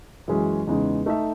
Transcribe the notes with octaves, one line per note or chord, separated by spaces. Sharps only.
F#2 E3 G#3 C#4 G#4
E2 C#3 G#3 D#4
A3 D#4 A4 E5